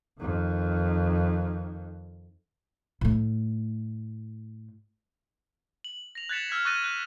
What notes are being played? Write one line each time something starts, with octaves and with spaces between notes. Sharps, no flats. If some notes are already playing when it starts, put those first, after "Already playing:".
F2 D#3
A2 A3
F#7
A#6 F7
F#6 G#6 A6 B6 C#7 E7
E6 F6 G#6 B6
C#6 E6 F#6 A6 A#6 D#7
F#6